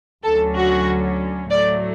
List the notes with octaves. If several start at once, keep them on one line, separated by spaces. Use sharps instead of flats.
D2 D3 F#3 C#4 A4
F#4
A2 F#3 A3 D5